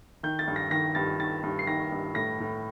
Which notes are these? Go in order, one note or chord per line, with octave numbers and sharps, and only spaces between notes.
D#3 G6
A6
G2
A#6
D#3 A#6
G2 A6
D#3 A6
G2
C7
D#3 A#6
G2
A2 A#6
A2